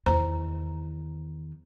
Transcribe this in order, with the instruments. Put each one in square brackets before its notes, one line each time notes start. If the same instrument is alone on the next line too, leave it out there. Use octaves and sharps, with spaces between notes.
[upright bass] E2 D#3 [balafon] C5 A#5